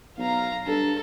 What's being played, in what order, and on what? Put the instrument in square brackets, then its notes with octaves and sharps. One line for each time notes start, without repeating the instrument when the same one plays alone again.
[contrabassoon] B1 [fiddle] F5 A#5
[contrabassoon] G2 [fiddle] A4